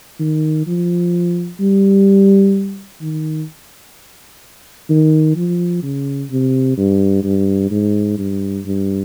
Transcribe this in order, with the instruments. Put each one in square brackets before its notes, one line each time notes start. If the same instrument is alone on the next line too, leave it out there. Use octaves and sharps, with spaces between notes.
[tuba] D#3
F3
G3
D#3
D#3
F3
C#3
C3
G2
G2
G#2
G2
G2